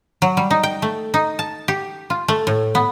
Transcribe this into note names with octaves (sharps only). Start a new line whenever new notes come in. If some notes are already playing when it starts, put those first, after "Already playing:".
F#3
G3
D#4
G5
A3
D#4
A5
G4
F4
A3
A2
B3